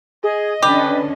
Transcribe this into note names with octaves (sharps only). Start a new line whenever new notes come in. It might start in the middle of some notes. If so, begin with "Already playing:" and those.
G#4 D#5
D3 C#4 D4 G4 B4